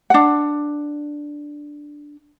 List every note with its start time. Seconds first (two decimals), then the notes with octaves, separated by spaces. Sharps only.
0.10 D4 F#5